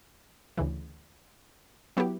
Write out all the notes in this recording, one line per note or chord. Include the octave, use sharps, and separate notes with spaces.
D2 C#3 E3
F#3 B3 E4 G4